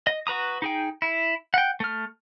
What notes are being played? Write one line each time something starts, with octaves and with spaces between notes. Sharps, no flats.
D#5
F#4 B4 A#5 D#6
D#4 G#4 G5
E4
F#5 G5
A3 F6